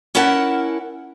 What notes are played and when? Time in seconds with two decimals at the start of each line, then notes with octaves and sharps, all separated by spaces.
0.15 C#4 E4 A#4 F#5 A5